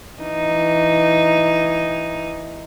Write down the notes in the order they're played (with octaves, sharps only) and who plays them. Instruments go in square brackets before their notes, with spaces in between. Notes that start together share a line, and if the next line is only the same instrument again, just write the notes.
[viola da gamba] E3 D#4